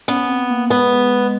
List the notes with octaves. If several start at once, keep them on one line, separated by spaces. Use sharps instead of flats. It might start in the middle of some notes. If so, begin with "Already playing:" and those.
B3 C#4
C4
A#3
G#3 B3